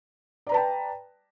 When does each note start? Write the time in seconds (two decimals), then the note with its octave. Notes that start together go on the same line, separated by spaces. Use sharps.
0.47 D5
0.49 A#5
0.52 B4
0.54 A5
0.57 G5